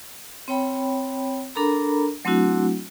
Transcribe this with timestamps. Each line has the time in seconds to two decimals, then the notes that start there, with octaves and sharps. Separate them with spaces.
0.48 C4 C#5 G5 B5
1.55 D4 A4 A#4 A#5 B5
2.25 F#3 A3 C4 D4 E4 F#4